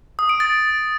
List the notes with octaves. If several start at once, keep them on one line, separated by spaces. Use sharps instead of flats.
D#6
D7
A6